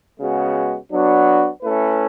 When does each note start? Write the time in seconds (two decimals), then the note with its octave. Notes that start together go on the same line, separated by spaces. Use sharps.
0.19 C#3 G#3 B3 F#4
0.90 F#3 B3 D4 F#4
1.63 A3 C#4 E4 B4